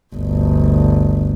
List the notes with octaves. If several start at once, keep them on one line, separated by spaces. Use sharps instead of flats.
G1 D2